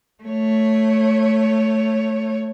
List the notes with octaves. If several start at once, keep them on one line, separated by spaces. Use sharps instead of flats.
A3 C#5